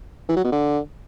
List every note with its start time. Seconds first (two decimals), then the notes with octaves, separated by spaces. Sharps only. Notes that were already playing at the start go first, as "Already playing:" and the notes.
0.29 E3
0.37 F#3
0.44 B2
0.52 D3